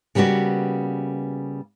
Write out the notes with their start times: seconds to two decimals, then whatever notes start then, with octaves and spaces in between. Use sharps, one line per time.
0.15 C#3 G3 A#3 B3 F#4